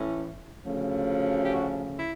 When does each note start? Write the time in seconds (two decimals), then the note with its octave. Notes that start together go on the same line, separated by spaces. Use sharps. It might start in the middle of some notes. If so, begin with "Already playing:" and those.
Already playing: A2 E3 A3 C#4
0.64 D2 C#3 F3 A3 C#4
1.45 G4
1.53 F#4
1.99 E4